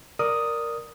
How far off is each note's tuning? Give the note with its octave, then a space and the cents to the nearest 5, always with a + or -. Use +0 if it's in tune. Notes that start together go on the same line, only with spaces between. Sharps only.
A#4 +0 D5 +0 D#6 +0